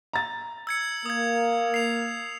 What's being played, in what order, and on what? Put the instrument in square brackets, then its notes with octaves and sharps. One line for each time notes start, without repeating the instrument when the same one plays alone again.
[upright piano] A#5 A6
[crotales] E6 G#6 C#7
[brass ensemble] A#3 [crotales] D#6 G#6
[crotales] C7 F7